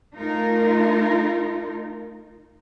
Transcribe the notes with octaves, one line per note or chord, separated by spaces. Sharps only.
A3 D#4 F4 A#4